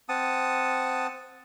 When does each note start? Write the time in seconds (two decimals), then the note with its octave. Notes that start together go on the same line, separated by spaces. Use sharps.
0.09 C4 F#5 A5 D#6